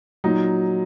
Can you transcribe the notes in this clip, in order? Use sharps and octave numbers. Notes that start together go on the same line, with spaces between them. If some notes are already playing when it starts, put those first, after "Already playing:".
A#2 F#3 D#4